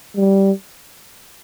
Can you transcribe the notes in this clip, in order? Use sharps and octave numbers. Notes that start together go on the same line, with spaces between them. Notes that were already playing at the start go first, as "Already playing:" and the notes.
G3